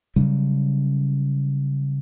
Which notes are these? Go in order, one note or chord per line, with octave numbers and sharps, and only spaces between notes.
C#3 F#3 G3 C#4